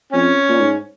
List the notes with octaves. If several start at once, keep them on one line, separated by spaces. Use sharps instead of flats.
F2 C#4
A#2
G#2